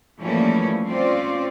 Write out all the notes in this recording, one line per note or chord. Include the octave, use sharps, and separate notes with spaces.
E3 F3 G3 A3 A#3 C#4
C4 C#4 F4 C5 D5